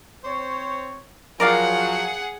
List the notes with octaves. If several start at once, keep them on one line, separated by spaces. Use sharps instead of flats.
C4 C5 C#5
F3 F#3 G#4 A#4 D5 F5 F#5